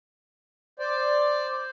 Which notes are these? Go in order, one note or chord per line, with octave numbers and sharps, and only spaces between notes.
C5 D5